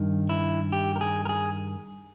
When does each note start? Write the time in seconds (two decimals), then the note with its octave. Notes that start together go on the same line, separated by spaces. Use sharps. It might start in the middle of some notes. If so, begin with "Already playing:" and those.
Already playing: G2 D#3
0.29 E4
0.72 G4
0.96 A#4
1.01 G#4
1.25 A#4
1.29 G#4